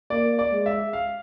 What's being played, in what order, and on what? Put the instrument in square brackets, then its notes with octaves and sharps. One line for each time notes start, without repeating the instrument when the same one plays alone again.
[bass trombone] A#3 [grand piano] D5
[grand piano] D5
[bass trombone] G#3
[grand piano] E5
F5